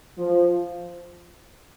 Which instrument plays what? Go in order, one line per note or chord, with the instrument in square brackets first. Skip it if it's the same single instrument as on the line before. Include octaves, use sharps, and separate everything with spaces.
[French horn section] F3